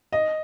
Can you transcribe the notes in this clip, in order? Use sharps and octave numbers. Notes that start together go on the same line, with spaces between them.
D#5